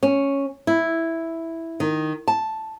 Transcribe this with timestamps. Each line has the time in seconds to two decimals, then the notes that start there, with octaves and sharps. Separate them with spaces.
0.03 C#4
0.67 E4
1.80 D#3
2.28 A5